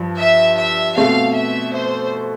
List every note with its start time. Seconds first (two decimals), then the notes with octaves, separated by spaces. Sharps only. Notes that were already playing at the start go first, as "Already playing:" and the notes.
Already playing: G2 F3
0.18 E5
0.58 E5
0.96 B2 A3 C4 F5
1.35 E5
1.74 C5